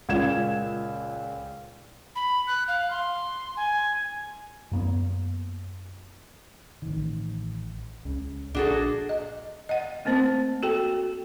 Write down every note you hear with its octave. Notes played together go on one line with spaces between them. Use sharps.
C#2 A#2 G#6 E7
B5
F#6
F5
C6
G#5
F#2 A#3 B3
A1 D#3
C#2 C#3
A#1 A#2 D4 F#4 G#4 A4
D#5
D#5 F#5
A3 A#3 C4 C5 A5
F#4 A4 G5